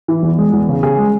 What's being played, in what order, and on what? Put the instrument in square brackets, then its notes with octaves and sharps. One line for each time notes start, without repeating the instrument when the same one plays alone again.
[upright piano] E3
E2
G#3
E2
C#3
C#3 G#4
G#3